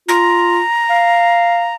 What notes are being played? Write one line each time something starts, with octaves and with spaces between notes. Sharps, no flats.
F4 A#5
F5